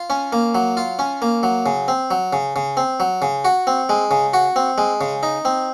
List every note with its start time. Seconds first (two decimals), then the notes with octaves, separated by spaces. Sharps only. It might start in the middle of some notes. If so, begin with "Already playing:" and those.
Already playing: F4
0.10 C#4
0.33 A#3
0.55 F#3
0.77 F4
0.99 C#4
1.22 A#3
1.43 F#3
1.66 C#3
1.88 C4
2.11 F#3
2.33 C#3
2.56 C#3
2.77 C4
3.00 F#3
3.22 C#3
3.45 F#4
3.67 C4
3.89 G#3
4.11 C#3
4.34 F#4
4.56 C4
4.78 G#3
5.01 C#3
5.23 D#4
5.45 C4